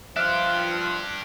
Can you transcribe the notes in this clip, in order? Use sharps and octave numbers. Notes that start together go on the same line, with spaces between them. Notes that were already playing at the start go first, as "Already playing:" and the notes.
F3 D4 G4 E5 F6 F#6